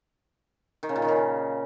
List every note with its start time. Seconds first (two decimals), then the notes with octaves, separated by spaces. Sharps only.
0.83 D#3
0.89 C#3
0.96 A#2
1.02 D#3
1.08 C#3